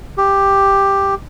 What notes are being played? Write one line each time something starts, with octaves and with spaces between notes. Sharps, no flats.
G4